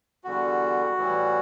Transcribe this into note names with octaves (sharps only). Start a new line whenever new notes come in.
E2 D3 G3 F#4
A2 E3 G3